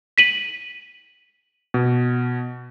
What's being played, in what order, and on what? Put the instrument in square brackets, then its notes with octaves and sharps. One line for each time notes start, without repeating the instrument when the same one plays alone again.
[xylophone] B6 D#7 F#7
[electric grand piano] B2